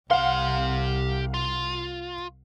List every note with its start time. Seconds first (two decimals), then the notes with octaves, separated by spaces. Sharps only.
0.11 C2 G4 F5 F#5 C6
1.34 F4